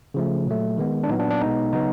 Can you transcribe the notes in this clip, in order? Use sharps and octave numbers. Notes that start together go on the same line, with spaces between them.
C#3 F3 A3
A#2 F#3 A3
D#3 G#3 B3
D4
A#2 F#3 B3 D#4
D4
D4
B2 G#3 B3 D#4
C#3 F#3 B3 D#4